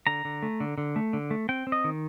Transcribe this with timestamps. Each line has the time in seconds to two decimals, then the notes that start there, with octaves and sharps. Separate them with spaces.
0.07 D3 A#5
0.25 D3
0.43 A3
0.60 D3
0.78 D3
0.96 A3
1.13 D3
1.31 A3
1.49 C4 G5
1.67 C4
1.72 D#5
1.84 D#3